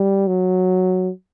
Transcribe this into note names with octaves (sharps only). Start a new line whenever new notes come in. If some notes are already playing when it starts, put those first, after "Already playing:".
Already playing: G3
F#3